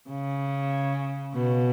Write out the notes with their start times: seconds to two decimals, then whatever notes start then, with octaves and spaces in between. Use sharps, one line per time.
0.10 C#3
1.34 B2